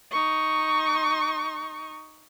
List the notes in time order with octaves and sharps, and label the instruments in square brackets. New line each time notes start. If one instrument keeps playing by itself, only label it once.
[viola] D#4 C#6